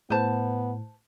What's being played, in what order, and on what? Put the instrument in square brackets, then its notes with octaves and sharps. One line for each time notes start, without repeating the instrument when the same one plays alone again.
[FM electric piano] A2 [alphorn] B3 [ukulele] B4 C5 A5